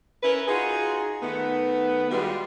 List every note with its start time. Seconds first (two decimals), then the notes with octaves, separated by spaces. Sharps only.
0.23 C#4 E4 A#4 B4
0.48 D#4 F4 F#4 G#4
1.22 D#3 A3 B3
2.10 G3 G#3 F4 F#4 B4